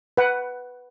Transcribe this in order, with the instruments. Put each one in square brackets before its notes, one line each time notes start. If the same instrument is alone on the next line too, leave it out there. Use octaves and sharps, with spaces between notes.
[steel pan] B4 F#5